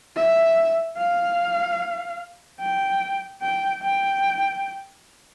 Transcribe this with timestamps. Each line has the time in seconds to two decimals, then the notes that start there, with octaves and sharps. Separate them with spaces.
0.16 E5
0.97 F5
2.60 G5
3.42 G5
3.83 G5